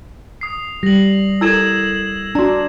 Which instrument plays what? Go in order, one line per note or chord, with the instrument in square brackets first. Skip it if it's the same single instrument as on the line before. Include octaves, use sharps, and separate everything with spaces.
[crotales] D#6 C7
[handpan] G3 [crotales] A#6 F#7
[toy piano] E4 A4 A#4 [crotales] E6 G#6 E7
[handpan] D4 [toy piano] F#4 A#5